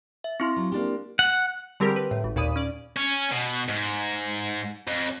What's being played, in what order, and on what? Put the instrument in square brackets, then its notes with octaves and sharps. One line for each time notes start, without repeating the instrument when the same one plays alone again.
[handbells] E5
C4 E4 C6
[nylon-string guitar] F#3
A#3 D4 G4
[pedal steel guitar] F#5
[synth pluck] D3 G3 C4 G4 G#4 A#4
B4
A2
G#1
D#2 A#2 D5 B5 D#6 D#7
C#4 D5
[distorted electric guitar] C#4
B2
G#2
F2